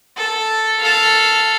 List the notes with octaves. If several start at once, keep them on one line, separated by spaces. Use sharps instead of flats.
A4
A4 F5